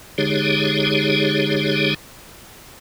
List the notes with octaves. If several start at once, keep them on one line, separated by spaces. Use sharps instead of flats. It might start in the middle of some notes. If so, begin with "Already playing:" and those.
D3 G#3 D#4 G4 G#4 C#5